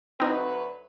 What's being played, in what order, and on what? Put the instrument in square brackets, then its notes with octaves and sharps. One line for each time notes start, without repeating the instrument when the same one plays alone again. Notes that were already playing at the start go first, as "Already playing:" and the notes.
[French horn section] D2 F#3 B4 [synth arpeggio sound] C4 D#4